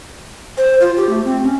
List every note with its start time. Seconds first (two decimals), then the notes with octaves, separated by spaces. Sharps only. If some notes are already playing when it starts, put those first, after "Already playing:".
0.57 C5
0.81 F4
0.97 G4
1.09 A3
1.25 C4
1.43 C#4